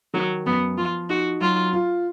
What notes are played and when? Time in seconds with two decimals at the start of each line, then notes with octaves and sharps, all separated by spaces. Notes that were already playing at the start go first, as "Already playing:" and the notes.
0.14 D#3 F#3
0.46 F#2 B3
0.77 F3 F4
1.09 D#4 F#4
1.41 F#3 F4
1.73 F4